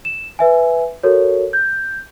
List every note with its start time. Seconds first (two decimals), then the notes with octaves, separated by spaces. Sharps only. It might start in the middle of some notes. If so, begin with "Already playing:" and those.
0.05 E7
0.39 B4 E5 G#5
1.03 F#4 A4 A#4 C#5
1.53 G6